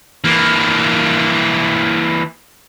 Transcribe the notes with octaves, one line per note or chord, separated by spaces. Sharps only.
E3 A#3